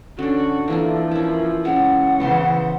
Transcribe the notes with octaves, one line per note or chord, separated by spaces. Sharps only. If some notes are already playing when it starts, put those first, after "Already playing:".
D3 C#4 D4 F#4
E3 F3 A#3 D4 A4
C#4 E4 A#4
C#3 G#3 C#4 F#5
C#3 E3 B3 C5 A5 C6